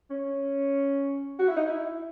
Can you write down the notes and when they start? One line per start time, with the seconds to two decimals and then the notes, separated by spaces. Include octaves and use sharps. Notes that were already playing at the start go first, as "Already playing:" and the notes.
0.10 C#4
1.39 F#4
1.48 E4
1.56 D#4
1.66 E4